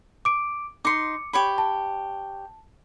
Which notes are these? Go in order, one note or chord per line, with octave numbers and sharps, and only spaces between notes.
D6 D7
D#4 C6 D6 C#7
G4 C#5 B5
A5